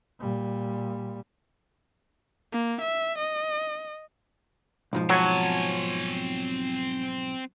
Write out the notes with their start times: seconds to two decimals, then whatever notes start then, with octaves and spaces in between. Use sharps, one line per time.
0.19 A#2 G3
2.52 A#3
2.81 E5
3.18 D#5
4.93 B1 G#2 F3
5.10 F#3 C4 C#5 G#5 A5